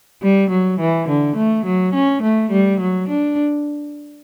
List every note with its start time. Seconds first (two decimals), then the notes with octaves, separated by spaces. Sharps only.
0.23 G3
0.50 F#3
0.80 E3
1.08 D3
1.36 A3
1.66 F#3
1.94 C#4
2.22 A3
2.51 G3
2.80 F#3
3.08 D4